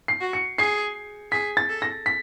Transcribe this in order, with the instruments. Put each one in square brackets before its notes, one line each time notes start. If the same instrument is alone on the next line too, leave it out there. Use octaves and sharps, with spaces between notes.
[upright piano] C7
[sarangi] F#4
[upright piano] C#7
[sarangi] G#4 [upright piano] C7
[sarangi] G#4 [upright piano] B6
[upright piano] A6
[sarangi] A4
[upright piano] A#6
B6